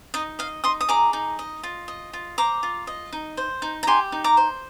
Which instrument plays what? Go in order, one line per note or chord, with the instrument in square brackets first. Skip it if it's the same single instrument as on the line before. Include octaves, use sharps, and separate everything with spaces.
[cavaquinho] D#4 D#5
D#5 F5
D#4 C6 D#6
D#6
G#4 A#5 D6
D#4
D#5
F4
D#5
F4
C5 A#5 D6
F4
D#5
D#4
C5
D#4
A#5
G4 G#5 C6
D#4
A#5 D6
C5